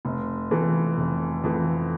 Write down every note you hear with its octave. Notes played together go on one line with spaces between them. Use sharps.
F1
F2 E3 A3
F1
F2 E3 A3